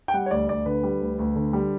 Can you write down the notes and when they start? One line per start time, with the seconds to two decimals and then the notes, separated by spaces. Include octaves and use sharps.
0.08 G5
0.14 G3 F#5
0.26 C#5
0.31 D2 D5
0.49 D2 D5
0.66 D3 B4
0.83 G3
1.01 D2
1.19 D2
1.36 D3
1.53 G3